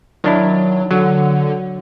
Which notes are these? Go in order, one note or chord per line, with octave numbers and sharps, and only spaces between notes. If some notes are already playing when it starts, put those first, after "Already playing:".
D#3 F#3 D4 E4
D3 F#3